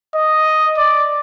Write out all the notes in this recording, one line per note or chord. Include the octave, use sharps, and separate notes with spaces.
D#5
D5